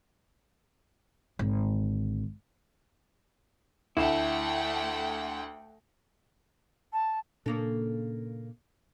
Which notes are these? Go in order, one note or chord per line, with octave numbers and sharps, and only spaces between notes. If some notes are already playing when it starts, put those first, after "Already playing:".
G#1 D3
D2 A3 E4 F#5 G5
A5
A#2 C#3 A#3 D4 A4